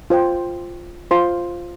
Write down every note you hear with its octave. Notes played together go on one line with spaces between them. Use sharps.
F4 C5 G5
F4 C5 F5 C6